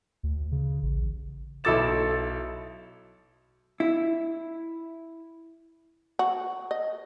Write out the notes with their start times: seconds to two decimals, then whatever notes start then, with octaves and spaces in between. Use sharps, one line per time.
0.23 D2
0.52 C#3
0.83 A1
1.64 B1 E4 A4 D6 A6 E7
3.80 E4
6.19 F#4
6.71 D#5